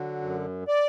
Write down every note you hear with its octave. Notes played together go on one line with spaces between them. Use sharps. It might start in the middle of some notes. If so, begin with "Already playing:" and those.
Already playing: D3 F#3
F#2
D5